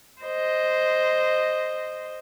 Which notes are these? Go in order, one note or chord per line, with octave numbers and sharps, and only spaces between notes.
C5 D#5